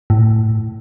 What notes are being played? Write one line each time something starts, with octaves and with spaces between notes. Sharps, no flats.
A2